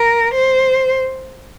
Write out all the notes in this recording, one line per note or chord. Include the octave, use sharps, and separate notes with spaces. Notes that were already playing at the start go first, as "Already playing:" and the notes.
Already playing: A#4
C5